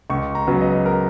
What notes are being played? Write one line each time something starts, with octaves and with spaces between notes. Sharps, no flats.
C#2 C#6
A#5
C#3 F#3 B3
D#5
A#4